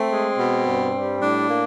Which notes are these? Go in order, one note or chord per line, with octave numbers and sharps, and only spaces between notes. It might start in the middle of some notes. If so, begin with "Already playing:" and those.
Already playing: A3 C4
G#3
B2
G2
G3
A2 D4
A#3